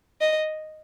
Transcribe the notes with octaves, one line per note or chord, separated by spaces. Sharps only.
D#5